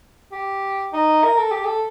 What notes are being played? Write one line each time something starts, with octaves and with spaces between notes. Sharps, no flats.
G4
D#4
A#4
A4
G4
A4